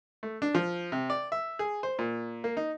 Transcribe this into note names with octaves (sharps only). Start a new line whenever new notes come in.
A3
D4
F3
C3
D5
E5
G#4
C5
A#2
A#3
D#4